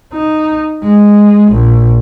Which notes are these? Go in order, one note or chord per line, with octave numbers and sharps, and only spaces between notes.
D#4
G#3
A#1